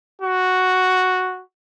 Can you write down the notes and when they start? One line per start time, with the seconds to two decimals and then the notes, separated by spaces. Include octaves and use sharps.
0.22 F#4